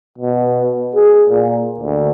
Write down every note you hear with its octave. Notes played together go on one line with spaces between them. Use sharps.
B2
G#4
A#2
D2